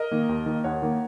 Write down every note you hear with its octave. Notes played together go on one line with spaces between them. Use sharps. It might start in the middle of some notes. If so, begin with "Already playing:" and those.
Already playing: A#4 D#5
D#3 A#3
D#2
D#3 A#3
D#2 C#5 F#5
D#3 A#3